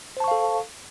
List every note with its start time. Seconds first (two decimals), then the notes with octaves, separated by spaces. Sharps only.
0.17 C5
0.20 A5
0.24 C#6
0.28 F5
0.31 A4